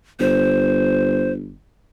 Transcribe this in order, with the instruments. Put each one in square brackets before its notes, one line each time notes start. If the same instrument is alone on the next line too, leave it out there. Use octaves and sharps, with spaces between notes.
[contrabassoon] G1 [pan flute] C5